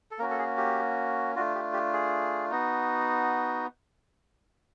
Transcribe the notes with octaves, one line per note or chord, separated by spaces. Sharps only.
A4
A#3 C#4 F#4 A#4
A4
G#4
G4
A3 D4 F4 F#4
G4
G4
G#4
B3 D#4 F#4